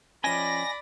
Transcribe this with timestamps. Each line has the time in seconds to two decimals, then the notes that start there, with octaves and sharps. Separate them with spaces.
0.24 F3 C#4 D5 D#5 G5 G#5 B5 A#6